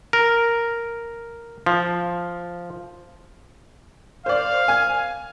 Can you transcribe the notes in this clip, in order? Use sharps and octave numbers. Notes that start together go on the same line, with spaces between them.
A#4
F3
C5 D5 F5
G#5 G#6